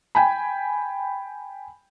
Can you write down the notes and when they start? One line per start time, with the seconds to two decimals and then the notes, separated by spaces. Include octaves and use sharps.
0.15 G5 G#5 B5